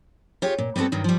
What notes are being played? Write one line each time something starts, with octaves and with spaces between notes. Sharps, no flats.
F4 G4 G#4 C#5
A#2
G3 B3 C4 F#4 A4
G2 D#3 F#3
F3 G3